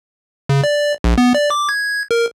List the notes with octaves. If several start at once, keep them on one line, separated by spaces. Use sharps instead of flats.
C#3
D5
A#1
B3
D5
D6
G#6
A#4